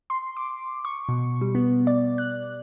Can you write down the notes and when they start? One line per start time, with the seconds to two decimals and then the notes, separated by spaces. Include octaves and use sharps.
0.10 C6
0.37 D6
0.85 C#6
1.09 B2
1.41 G3
1.55 B3
1.87 D5
2.18 F#6